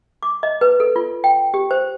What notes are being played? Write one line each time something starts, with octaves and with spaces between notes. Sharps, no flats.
D6
D#5
B4
A4
F4
G5
G4
C5